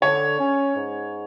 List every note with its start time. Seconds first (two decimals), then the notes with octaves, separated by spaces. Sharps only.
0.02 D3 C#5
0.39 C#4
0.76 G#2